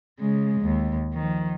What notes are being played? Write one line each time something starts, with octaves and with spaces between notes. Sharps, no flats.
C#3 G#3
D#2
D#3 F3